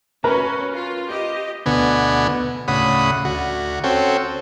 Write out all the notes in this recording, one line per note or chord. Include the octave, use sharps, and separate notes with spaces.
C#4 F#4 A#4 B4 A#5
F4
G4 D#5
D2 B2 D3 B3 G#5
D2 A2 C#3 F#5 B5 D#6
D2 F#4
C4 C#4 F#4 A4 G5